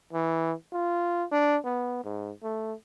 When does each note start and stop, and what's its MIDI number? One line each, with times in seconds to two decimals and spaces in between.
0.13 0.53 52
0.73 1.24 65
1.32 1.57 62
1.65 2.03 59
2.04 2.31 44
2.43 2.73 57